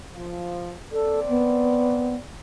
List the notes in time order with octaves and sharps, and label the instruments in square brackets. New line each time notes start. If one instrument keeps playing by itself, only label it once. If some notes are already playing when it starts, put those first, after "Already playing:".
[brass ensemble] F3
[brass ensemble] A#3 C4 D5 [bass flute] A4
[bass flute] B3